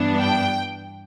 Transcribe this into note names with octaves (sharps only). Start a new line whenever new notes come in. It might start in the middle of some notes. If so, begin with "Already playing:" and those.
Already playing: G2 E3 B3 D4
G5